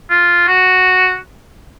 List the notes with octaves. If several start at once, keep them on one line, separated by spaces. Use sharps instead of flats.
F4
F#4